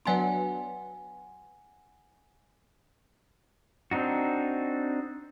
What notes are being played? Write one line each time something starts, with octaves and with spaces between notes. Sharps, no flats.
F#3 B3 D4 F#5 G#5 C6
C4 D4 D#4 F#4